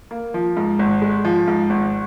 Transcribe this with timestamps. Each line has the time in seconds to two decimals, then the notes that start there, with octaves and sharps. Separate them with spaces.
0.11 A#3
0.34 F3
0.57 G#2
0.79 G#1
1.02 G#3
1.25 F3
1.48 G#2
1.70 G#1